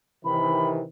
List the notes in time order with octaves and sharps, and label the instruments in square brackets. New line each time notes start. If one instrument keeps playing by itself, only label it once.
[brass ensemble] C3 D#3 E3 [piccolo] B5